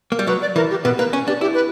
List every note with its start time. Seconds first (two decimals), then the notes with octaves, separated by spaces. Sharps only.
0.12 A#3
0.19 G3
0.27 F#3 B4
0.41 D5
0.56 E3 A#4
0.70 G4
0.84 B2 B4
0.98 A#3 B4
1.13 C#4
1.27 D4 G4
1.41 E4 G4
1.54 B4